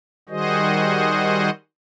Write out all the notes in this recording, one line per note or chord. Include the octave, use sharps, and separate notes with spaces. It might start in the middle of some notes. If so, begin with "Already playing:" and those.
D#3 G3 F#4 G#4 C5 D#5